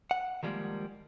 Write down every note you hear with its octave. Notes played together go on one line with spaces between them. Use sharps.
F#5
D#3 F3 G3 G#3 A#3